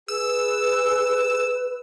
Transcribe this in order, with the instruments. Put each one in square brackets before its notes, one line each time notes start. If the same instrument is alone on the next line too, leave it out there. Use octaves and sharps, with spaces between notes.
[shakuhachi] G#4 [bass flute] B4 [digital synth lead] E6